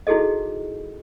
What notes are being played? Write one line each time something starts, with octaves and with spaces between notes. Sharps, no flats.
D#4 E4 F#4 G#4 A4 D#5